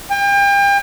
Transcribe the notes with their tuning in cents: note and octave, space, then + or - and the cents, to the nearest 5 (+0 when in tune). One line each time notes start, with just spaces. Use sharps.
G5 +35